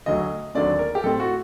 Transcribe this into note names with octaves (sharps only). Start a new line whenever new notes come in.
D2 D3 F#3 A3 D#5
D#2 D3 F#3 A3 C4 D5
A#4
G4
A2 A3 C4 A4
F#4